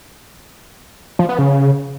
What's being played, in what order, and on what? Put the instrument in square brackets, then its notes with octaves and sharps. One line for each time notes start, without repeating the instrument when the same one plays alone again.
[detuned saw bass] F3
B3
C#3